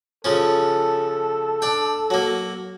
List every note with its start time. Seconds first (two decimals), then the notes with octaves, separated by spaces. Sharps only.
0.25 C#3 F3 C#4 A4
1.62 D4 G5
2.10 F#3 A#3